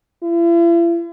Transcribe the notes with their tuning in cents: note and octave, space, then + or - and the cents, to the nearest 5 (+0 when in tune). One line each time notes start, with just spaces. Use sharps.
E4 +45